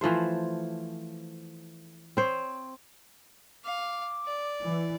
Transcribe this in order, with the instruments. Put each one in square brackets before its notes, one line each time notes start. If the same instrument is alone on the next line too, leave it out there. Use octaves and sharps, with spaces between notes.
[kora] E3 F3 A3 C5
C4 C5 C#5
[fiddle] F5 [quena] D6
[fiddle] D5
[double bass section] E3